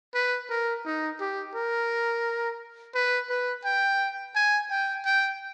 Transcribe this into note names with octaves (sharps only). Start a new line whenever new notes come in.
B4
A#4
D#4
G4
A#4
B4
B4
G5
G#5
G5
G5